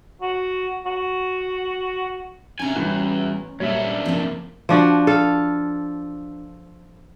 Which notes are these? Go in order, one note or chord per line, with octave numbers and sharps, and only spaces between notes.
F#4
F#4
F#2 C3 C#4 G#5 A#5
A1 E2 G3 B3 F#4
F#2 A#2 G3 A3 C#5 E5
D4 D5
C3 F3 A#3 C4
F3 D4 F#4
A4 F5